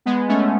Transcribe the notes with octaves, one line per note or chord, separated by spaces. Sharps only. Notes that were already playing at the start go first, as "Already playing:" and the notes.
G#3 B3
A3 C#4